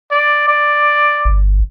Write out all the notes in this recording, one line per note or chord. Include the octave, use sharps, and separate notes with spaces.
D5
D5
G1